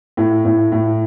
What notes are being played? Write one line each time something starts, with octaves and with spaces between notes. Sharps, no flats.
A2
A2
A2